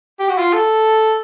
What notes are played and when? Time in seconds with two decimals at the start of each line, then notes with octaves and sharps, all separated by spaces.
0.19 G4
0.29 F#4
0.38 F4
0.53 A4